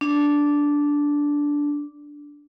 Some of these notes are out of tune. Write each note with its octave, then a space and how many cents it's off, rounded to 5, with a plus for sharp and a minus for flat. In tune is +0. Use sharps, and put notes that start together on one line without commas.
D4 -10